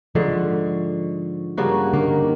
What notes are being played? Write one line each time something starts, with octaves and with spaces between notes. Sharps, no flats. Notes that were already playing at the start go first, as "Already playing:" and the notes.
G#2 D3 F3 C#6
G2 C#3 A#3 F#4
D3 D#3 A#3